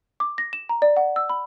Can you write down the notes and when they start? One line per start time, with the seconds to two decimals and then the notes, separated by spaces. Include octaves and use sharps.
0.20 D6
0.38 A#6
0.53 E7
0.69 A#5
0.82 D5
0.97 F#5
1.16 E6
1.30 B5